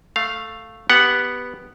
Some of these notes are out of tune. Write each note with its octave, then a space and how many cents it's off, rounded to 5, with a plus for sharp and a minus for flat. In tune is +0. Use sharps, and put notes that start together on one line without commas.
A3 +0 F5 +0
B3 +0 G4 +0 F#5 +0